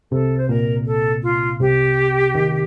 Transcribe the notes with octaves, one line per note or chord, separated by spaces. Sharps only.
C2 C3 A4
C5
A#2 A#4
A4
F4
C2 C3 G4
D#2 D#3